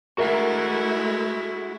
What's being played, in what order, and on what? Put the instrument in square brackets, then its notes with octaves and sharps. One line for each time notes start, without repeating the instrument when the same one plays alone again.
[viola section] G#3 A3 E4 [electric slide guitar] F#4 E5 F#5 [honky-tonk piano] A#4